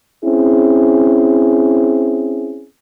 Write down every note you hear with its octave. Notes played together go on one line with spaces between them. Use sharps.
C4 C#4 E4 G#4